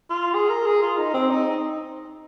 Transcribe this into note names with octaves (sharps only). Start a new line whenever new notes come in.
F4
G#4
A#4
G#4
F4
D#4
C4
D#4